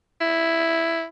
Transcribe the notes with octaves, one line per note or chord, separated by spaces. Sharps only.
E4